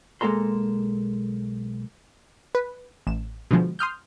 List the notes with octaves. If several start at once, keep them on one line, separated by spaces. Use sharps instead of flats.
B1 G#3 A#3 A4 A#5 C6
B4
A1 E7
B2 D3 F3 G#3
C6 D#6 F6 G6